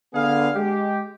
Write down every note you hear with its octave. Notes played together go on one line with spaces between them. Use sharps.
D3 B3 G#4 F5
G#3 G4